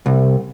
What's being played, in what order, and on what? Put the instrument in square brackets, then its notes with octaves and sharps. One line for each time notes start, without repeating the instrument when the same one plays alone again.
[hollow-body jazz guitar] C2